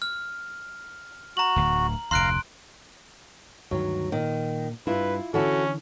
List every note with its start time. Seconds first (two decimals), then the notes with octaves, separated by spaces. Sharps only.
0.02 F6
1.37 F#4 A#5 F#7
1.56 D1 D2
2.11 F1 D2 F5 A#5 C6 F#6 D7
3.71 D2 G2 D#3 F#3
4.12 A#2 D#3
4.87 G2 E4 F4 B4
5.34 D3 E3 C#4 E4 F#4 A4